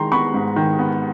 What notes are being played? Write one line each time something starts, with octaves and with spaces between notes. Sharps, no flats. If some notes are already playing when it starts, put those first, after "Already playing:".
Already playing: D#3 G#3 A#5 C6
B3 B5 C#6
G#2
D#3
B3